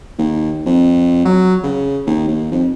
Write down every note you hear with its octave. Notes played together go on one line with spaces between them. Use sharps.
D#2
F2
F#3
C#3
D#2
D#2
F2